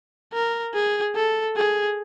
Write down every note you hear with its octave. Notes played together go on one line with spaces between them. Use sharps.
A#4
G#4
A4
G#4